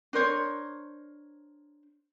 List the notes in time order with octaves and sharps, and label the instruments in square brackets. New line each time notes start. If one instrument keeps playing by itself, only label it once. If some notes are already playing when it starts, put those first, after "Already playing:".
[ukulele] D4 A#4 C5 C#5